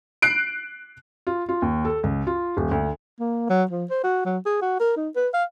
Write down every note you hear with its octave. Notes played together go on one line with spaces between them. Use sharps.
F#6 C7 D7
F4
F4
D#2
A4
C#2
F4
D#1
D2
A#3
F#3
F3
C5
F#4
F#3
G#4
F#4
A#4
D#4
B4
F5